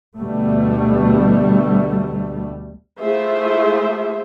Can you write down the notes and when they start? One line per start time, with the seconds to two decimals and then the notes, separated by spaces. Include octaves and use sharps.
0.17 D2 B2 G3 A3
2.99 A3 E4 F4 G#4 C5 E5